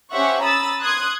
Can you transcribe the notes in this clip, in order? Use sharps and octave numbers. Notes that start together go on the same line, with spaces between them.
C#4 G4 C5 E5 F#5 C#6
A#5 B5 D#6 E6 A6
C6 D#6 F#6 G#6